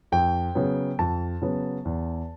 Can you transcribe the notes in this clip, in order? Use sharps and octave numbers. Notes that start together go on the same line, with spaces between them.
F2 G5
C#3 F#3 B3
F2 A5
C#3 F#3 B3
E2